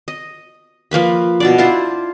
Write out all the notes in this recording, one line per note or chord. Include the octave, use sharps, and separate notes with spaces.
D#5
F3 A#3 B4 B5
B2 D4 D5
D4 E4 F4 C5